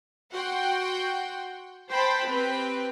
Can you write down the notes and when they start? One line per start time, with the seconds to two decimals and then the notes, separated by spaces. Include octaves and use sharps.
0.32 F#4 F#5 G5 C6
1.89 C5 F#5 G5 A5 B5
2.27 C4 G4 B4 G5